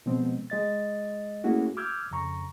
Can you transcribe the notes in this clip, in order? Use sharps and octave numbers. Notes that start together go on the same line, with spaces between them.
B2 F3 G#3 B3 C4
G#3 D#5 A6
A3 A#3 C#4 E4 F#4 G#4
D6 E6 F6 G6 G#6
F2 C#3 A#5 C#6